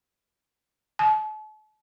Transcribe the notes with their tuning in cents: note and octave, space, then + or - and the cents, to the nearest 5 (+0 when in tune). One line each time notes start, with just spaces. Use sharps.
A5 -40